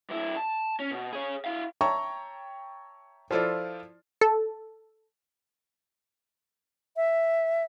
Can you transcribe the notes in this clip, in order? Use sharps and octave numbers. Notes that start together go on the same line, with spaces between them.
G2 E4
A5
C#4
B2
G#4 C#5
E4 F5
C#5 E5 G5 A5 A#5 C#6
F3 E4 F4 A4 C5 D5
A4
E5